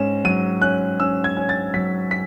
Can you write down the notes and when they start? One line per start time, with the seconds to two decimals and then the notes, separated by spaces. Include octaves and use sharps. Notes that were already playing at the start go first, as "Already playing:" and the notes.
Already playing: G#2 C#4 E7
0.24 F#3 D#7
0.61 C#4 F#6
1.00 C#4 E6
1.24 G#6
1.37 C#4
1.49 A6
1.74 F#3 B6
2.11 B6